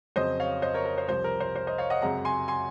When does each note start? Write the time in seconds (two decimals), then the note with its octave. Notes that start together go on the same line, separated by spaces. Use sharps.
0.16 F2 C#3 F#3 C4 C5 D#5
0.40 C#5 F5
0.62 C5 D#5
0.74 A#4 C#5
0.85 A#4
0.98 C5
1.09 C2 C3 F3 C5
1.24 A#4
1.40 C5
1.56 C5
1.67 C5 D#5
1.78 C#5 F5
1.90 D#5 F#5
2.02 F#2 C#3 G#3 C4 F#5 A#5
2.25 G#5 C6
2.48 G#5 C6